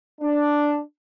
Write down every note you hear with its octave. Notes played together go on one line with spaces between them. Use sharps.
D4